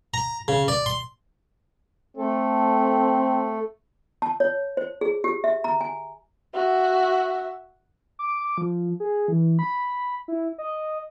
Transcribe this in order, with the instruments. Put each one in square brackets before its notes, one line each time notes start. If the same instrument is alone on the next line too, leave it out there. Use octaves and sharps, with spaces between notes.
[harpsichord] A#5
C#3
D5
C6
[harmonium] A3 A4 [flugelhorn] C4
[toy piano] A5
C#5
C5
G#4
G4
E5
A#5
G#5
[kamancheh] F#4 E5
[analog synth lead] D6
D6
F3
G#4
E3
B5
E4
D#5